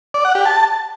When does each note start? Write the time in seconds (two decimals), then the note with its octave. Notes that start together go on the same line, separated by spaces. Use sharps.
0.14 D5
0.25 F#5
0.35 G4
0.45 A5